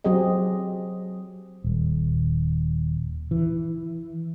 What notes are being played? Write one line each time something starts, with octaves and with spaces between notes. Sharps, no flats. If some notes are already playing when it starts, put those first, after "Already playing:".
F#3 C4 G4 G#4 D#5
D#1
E3